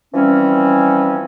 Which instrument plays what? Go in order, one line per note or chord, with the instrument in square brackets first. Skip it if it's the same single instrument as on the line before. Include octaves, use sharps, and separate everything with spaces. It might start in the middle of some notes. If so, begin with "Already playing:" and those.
[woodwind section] E3 F3 G3 C4 C#4